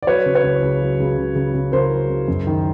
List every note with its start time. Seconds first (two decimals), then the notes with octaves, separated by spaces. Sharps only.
0.03 D5
0.07 F#3 B4 C#5
0.26 C#3
0.35 B4 C#5
0.44 C#2
0.62 C#2
0.81 F#3
1.00 C#2
1.18 C#3
1.35 C#3
1.54 C#3
1.72 C#3 A#4 C5
1.91 F#3
2.10 C#2
2.28 F#2
2.47 D#3